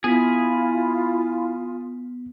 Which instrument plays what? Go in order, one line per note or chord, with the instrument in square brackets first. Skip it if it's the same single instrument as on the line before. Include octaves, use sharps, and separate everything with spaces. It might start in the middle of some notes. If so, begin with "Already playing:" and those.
[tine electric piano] B3 B6 [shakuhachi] E4 [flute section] F4 [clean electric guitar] G#4